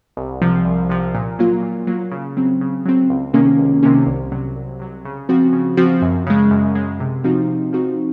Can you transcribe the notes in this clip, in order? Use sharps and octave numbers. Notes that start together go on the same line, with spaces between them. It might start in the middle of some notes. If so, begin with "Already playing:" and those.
C2
C3 F3
C2
C3 F3
A#2
F#3 A#3 F4
A#2
F#3 A#3 F4
C#3
F#3 C4
C#3
F#3 C4
C#2
C3 D#3 A#3 C#4
C#2
C3 D#3 A#3 C#4
C2
C3 F#3
C2
C3 F#3
C#3
F3 C4 F#4
C#3
F3 C4 F#4
F#2
C#3 G#3
F#2
C#3 G#3
C3
F3 C4 D#4 F#4
C3
F3 C4 D#4 F#4